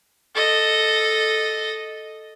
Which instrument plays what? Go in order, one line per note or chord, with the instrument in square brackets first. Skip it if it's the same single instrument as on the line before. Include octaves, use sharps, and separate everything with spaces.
[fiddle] A4 D#5